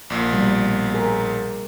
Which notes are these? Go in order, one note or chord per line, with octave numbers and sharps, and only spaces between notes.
A#1 A#2
B2 G3
G#4 A#4